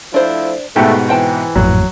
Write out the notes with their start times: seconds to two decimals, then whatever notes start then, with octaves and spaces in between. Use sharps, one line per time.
0.14 F3 A3 D4 E4 C5
0.76 G#2 B2 A3 G4
1.09 E3 C4 G5 A5
1.56 G#1 F2 A2 F#3